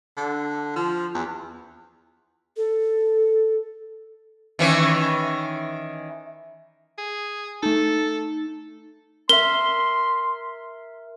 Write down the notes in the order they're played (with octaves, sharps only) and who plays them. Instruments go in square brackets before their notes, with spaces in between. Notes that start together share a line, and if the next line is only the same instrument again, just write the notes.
[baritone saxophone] D3
F3
E2
[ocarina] A4
[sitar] D#3 E3 C#4
[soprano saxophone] G#4
[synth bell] A3 D#4 [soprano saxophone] A4
[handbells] A#4 E5 [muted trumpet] C6 [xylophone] G7